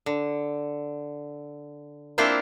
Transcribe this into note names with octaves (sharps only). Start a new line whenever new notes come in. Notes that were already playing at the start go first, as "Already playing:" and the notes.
D3
A#3 C4 D4 E4 F4 C5